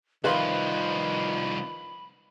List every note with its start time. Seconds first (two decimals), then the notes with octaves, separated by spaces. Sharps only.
0.24 C2 D#3 F3 B4 F5 B5 C6